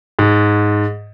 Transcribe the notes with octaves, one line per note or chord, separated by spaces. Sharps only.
G#2